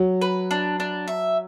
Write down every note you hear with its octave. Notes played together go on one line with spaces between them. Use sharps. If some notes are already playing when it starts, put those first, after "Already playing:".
Already playing: F#3
B4
D4
D4
E5